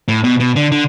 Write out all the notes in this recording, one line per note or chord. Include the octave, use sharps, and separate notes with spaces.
A2
B2
B2
D3
D3